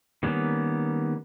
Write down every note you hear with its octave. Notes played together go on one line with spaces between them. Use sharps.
D#3 G3 A#3 B3 C#4